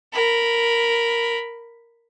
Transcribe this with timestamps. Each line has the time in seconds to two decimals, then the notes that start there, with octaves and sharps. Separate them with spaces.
0.13 A#4 B5